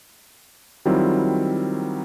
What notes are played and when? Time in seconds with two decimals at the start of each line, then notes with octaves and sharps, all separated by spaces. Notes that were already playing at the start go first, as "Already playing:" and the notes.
0.85 D#3 F#3 G3 C4 E4 F4